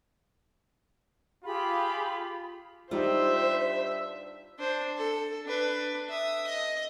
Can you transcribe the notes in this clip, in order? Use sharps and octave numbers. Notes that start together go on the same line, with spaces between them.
F4 G4 G#4 B5
G2 G3 D#4 F4 G4 C5 D5 E5
D4 C5
A4
D4 B4
E5 D#6
D#5